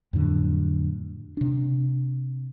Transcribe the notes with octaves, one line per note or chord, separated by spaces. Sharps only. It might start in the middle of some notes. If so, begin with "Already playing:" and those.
F2 A2 D3 F#3
C3 D4